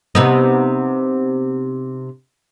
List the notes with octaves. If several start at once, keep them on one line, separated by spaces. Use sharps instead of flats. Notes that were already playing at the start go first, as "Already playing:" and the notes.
C3 B3 D#4